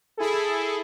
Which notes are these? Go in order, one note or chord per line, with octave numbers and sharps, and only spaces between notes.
E4 G#4 A4